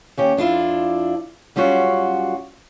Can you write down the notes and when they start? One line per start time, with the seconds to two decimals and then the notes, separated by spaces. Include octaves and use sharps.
0.17 D#2 C#4 G4
0.37 F2 D4 E4 F4
1.56 F#2 G3 C#4 F4 F#4